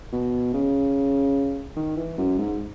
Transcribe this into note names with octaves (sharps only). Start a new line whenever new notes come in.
B2
C#3
D#3
E3
F#2
G#2